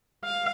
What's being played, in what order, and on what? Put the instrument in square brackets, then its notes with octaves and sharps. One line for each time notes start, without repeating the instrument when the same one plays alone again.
[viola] F5